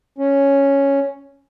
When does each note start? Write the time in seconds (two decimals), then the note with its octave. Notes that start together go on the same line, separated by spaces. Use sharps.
0.18 C#4